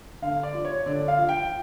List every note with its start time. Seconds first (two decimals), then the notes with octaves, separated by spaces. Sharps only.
0.22 D3 F5
0.43 D5
0.54 F3
0.65 C#5
0.86 D3 D5
1.08 F5
1.18 F3
1.29 G5